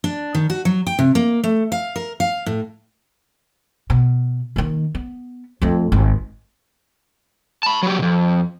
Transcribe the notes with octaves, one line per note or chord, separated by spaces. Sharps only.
D4
D#3
F#4
F#3
G5
C3
A#3
A3
F5
A#4
F5
A2
B2
D#3 A#3
B3
F2 A3
G#1
A5 B5
F#3 G4
F2 C3